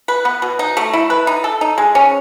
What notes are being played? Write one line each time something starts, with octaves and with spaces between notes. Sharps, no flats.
B4
B3
B2
D#4
A3
E4
B4
D#4
A4
D#4
G#3
C#4